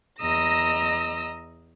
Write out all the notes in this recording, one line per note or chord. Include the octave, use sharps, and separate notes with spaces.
E2 D#5 A#5 D#6 E6 A#6